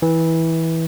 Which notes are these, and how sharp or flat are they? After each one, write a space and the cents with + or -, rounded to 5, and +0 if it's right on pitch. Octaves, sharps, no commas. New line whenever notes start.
E3 -15